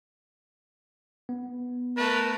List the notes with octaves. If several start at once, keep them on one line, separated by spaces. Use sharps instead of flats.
B3
A3 A#4 B4